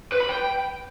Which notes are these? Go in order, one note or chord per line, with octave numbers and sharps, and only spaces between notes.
B4
B5
G5